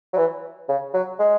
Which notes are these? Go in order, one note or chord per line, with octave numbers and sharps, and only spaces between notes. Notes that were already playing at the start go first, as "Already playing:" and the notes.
F#3
E3
C#3
F#3
G#3